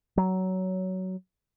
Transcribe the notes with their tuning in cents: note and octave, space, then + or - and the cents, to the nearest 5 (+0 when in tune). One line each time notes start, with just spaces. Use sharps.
F#3 +15